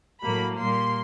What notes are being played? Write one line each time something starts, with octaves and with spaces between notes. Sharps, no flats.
A2 F#3 A#3 B5
A#2 G3 A#3 C6